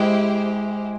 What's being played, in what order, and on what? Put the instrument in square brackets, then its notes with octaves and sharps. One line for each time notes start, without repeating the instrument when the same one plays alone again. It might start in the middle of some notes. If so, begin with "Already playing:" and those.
Already playing: [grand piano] G#3 [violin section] E4 G4 C5